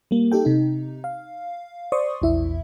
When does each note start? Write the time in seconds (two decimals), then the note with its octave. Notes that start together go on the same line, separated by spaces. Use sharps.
0.11 G3 A#3
0.32 D#4 G4 A4 G5
0.45 C3 D#4
1.04 F5
1.92 C5 D5 C6 C#6 D#6
2.22 A#1 E2 E4 E5